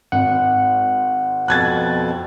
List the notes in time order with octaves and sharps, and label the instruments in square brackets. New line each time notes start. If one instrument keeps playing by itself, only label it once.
[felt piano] G#1 [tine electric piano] F#5
[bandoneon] F2 B2 [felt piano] F#6 G#6 A6